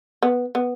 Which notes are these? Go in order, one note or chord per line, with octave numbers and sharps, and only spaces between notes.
B3
B3